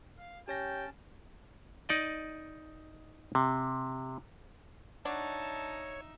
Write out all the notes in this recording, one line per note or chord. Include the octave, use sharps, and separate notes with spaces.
F5
C#4 G4 C#5 G5 A5 A#6
D#4 D5 D#5
C3
D4 D#4 F#4 C#5 E5 A5